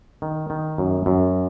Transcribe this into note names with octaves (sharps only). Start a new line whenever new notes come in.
D#3
D#3
F#2
F#2